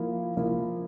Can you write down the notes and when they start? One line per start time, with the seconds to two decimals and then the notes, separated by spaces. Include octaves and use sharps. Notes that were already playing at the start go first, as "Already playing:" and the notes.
Already playing: F3 A#3 E4
0.37 F3 A#3 E4